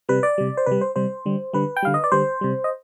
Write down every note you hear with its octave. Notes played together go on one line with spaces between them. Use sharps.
C3 G3 B4
D5
C3 G3
C5
C3 G3 B4
C5
C3 G3 C5
D3 G3
D3 G3 B4
G5
D3 G3 F5
D#5
D5
D3 G3 C5
C3 G3
D#5